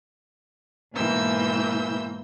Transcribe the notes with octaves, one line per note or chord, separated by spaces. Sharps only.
G#2 B2 E3 A#3 E6 G6